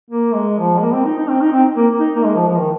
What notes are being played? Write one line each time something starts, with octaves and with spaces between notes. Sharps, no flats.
A#3
G#3
F3
G#3
A#3
C4
D#4
D#4
C4
D#4
C4
A#3
D#4
A#3
G#3
F3
F3
D#3